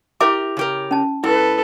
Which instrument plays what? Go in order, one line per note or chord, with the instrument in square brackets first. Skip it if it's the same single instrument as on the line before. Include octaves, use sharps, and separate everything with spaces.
[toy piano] E4 E5 D6 [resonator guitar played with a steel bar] G4 A#4
[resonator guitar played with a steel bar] C#3 G4 A#4
[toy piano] C#4 A5
[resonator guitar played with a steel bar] G#2 [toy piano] E4 [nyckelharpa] A4 B4